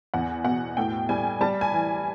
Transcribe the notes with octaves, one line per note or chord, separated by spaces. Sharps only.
E2 F#5
B2 F#5
A2 G5
G3 G#5
G3 A5
G#5
E3